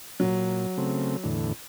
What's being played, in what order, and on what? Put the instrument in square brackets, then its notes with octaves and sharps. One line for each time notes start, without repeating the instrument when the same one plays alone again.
[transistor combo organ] A#2 [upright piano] F#3
[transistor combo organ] C#3 A3 C4
E2 A2 D3